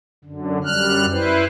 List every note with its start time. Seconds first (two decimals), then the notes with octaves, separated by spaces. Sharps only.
0.24 F#2 D3
0.64 F#2 G3 F6 F#6
1.11 E4 B4 C5